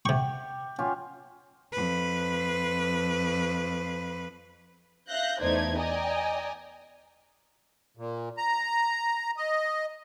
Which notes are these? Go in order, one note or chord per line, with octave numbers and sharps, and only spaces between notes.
C3 G4 C#6
C#4 F4 G4
F2 B4
E5 F5 F#6 G6 A#6
E2 A3 D#4 C5 D5 G#6
D5 D#5 G5 G#5 A#5
A#2
A#5
D#5